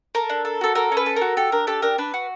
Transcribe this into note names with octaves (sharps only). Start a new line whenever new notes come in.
A4 A#4
D4
A4
F#4 A4
A4 A#4
C#4
B4
A4
F#4 A#4
G4 A4
D4 A#4
G4 A4
D4 A#4
D4 B4
F#4